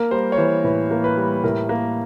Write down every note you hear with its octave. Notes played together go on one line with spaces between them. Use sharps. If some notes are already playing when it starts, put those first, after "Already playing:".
Already playing: A#3 A#4
G3 C5
C#5
E3 C5
A2 B4
A#3
B4
G3
A2 A#4
A#3